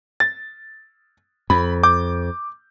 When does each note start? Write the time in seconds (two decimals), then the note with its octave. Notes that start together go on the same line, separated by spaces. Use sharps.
0.20 A6
1.50 F2 B5
1.83 D6 G6